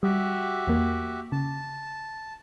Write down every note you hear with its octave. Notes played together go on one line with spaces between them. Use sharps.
G3 F#4 G4 E5
E2 A#3
C#3 A5